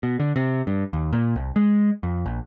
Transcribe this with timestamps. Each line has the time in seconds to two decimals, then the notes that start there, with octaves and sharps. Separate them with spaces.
0.03 B2
0.20 D3
0.36 C3
0.67 G2
0.93 D#2
1.13 A#2
1.36 C2
1.56 G#3
2.03 F2
2.26 A#1